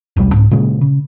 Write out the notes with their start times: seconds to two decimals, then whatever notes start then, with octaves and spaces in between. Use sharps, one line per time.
0.17 E1 C2 A#2 G3
0.33 C2 G#2
0.51 A#2 C#3 G#3
0.81 C#3